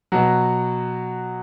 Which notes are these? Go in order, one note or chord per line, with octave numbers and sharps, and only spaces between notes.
B2 F#3 F#4